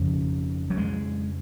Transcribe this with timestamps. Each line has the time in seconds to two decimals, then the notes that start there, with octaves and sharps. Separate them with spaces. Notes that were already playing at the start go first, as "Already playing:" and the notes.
Already playing: F2 C#3 F3
0.70 F#3
0.78 G#3